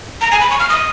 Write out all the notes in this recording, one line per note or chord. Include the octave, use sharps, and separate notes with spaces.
A#5
G#5
B5
C#6
F6
D#6